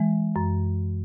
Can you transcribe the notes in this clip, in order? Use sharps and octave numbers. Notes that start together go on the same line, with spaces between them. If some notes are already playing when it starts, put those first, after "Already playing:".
Already playing: E3 G#3
F#2